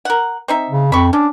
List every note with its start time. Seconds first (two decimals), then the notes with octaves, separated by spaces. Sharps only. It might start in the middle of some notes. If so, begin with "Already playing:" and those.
0.05 A#4 F#5
0.48 C4 D#4 E5
0.70 C#3
0.92 F2 B5 C#6
1.13 C#4 D4